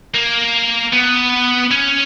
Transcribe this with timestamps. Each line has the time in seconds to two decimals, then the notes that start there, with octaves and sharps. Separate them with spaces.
0.15 A#3
0.93 B3
1.71 C#4